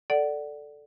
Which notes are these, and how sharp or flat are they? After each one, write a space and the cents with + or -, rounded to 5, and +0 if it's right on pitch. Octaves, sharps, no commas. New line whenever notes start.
A4 +0 D5 +0 F#5 +20